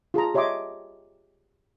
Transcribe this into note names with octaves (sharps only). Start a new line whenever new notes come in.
F4 G#4 A5 A#5
G4 C#5 D#5 E5 C6 D6